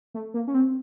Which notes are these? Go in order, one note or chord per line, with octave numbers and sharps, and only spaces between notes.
A3
A#3
C#4
C4